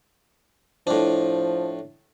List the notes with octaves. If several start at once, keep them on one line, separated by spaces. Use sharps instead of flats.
A2 F3 D4